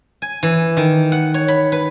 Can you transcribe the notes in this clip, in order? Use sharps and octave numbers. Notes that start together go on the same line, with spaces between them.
G#5
E3
D#3
F#5
C#5
B5
B4